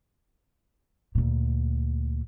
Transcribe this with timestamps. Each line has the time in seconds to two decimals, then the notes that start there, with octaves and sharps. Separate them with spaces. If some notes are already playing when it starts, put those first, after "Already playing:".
1.15 D2 A#2